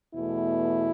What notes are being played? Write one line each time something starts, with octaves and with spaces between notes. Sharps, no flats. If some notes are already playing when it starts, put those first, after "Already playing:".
E2 B2 A3 E4